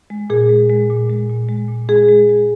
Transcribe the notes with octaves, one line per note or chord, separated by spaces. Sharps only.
G#3
A#2 G#4
G#3
G#3
A#2
G#3
A#2
G#3
A#2
G#3 G#4
G#3
G#3